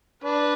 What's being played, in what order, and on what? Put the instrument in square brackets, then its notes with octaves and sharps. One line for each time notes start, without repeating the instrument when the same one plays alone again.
[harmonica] D4 [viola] B4